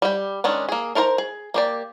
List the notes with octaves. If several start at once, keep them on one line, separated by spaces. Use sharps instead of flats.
G3 G5
D#3 G#3 C#4 D4
A#3 G#4
D#4 A#4 C5 E5 A#5
G#4
A#3 G4 D5